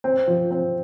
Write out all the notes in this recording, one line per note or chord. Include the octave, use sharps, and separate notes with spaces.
C4
F3
C4